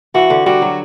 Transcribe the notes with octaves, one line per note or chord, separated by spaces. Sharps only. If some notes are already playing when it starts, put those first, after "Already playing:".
E3 F#4
D3
G3 F#4
F#3